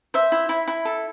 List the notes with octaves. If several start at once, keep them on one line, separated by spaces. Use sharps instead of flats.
C5 E5
E4
E4
E4
A4